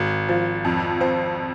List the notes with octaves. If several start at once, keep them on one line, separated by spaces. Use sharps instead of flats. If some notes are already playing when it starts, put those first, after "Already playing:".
Already playing: G#1
F3
F2
C4